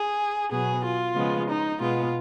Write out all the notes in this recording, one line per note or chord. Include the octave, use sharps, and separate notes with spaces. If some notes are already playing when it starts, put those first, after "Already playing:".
Already playing: G#4
B2 F#3 B3 G#4
F4
C#3 F3 G#3 B3
D#4
B2 G#3 B3 F4